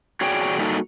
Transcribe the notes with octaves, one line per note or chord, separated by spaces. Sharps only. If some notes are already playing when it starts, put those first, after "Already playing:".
F#4 G#4 C#5 D5 G5
G3 A3 A#3 D#4 F#4 A4